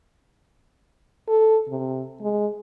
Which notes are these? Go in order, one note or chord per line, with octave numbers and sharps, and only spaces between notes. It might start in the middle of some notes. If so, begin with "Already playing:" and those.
A4
C3
G#3